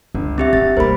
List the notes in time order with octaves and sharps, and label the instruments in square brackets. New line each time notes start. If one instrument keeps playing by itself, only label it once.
[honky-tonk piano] G1 [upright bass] C#2
[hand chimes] C4 G4 E5
[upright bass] D3 D#4 [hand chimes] A6
[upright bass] B1 F#2 [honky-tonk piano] G3 A#3 A#4 [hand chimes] C5 B5